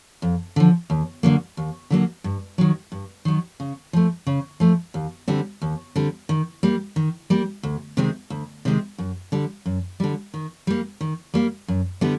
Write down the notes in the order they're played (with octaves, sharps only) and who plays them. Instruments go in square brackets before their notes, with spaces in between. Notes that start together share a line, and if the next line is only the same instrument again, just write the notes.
[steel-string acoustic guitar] F2
D3 F3
D#2
D3 F#3 A#3
D#2
D3 F#3 A#3
G2
D#3 F#3
G2
D#3 F#3
C#3
F3 A3
C#3
F3 A3
D#2
D3 G3 C4
D#2
D3 G3 C4
D#3
G3 A#3
D#3
G3 A#3
D2
C3 D#3 G#3 C4
D2
C3 D#3 G#3 C4
F#2
D3 G3
F#2
D3 G3
D#3
G3 A#3
D#3
G3 A#3
F#2
D3 G3 B3 E4